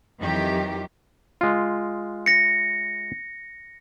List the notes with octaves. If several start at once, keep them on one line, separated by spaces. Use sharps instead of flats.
F2 D#3 E3 F#3 G4
G#3 F4
A#6 C#7